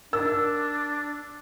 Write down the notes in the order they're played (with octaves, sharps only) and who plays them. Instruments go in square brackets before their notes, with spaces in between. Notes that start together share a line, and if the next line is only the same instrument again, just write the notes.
[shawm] D4 [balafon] A#4 [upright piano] E6